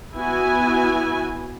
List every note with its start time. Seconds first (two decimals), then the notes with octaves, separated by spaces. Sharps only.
0.15 B3 E4 F#4 G#5